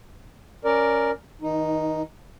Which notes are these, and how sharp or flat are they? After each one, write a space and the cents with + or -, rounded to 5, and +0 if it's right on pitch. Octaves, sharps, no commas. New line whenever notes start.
C#4 +0 A#4 +0 D5 +0
D#3 +35 D#4 +0